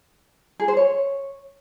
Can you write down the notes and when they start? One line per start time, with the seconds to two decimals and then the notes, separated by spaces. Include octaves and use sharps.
0.60 G#4
0.68 C5
0.77 C#5